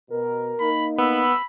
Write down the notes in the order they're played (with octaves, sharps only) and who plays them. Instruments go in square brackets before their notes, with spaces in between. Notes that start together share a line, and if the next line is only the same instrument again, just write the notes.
[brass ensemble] B2 [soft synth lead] A#4
[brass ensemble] A#3 D#4 [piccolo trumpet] B5
[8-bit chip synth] B3 [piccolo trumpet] B5 [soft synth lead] E6